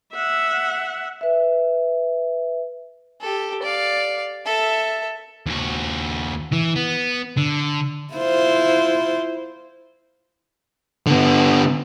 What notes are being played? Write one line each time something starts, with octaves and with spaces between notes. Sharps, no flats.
E5 F#5
B4 E5
G4 A4
D5 F5
A4 E5
D#2 F#4
E3
B3
D3
E4 F4 C5
D3 B3